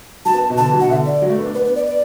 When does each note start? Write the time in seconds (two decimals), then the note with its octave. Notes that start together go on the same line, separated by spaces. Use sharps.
0.25 F#3 A5
0.34 B3
0.50 B2
0.57 D3 A5
0.65 E3
0.74 F#3
0.80 B2 F#5
0.89 D3 E5
1.06 D5
1.22 F#3
1.30 A3
1.39 B3
1.46 D4
1.55 B3 B4
1.65 B4
1.75 D5
1.86 D5